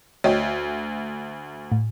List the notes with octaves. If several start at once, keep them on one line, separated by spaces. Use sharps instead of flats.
D2 C#5 D#5 G5
A2